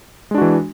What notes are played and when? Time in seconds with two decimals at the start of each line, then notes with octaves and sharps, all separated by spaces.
0.31 G#3
0.34 D4
0.38 F#4
0.41 E3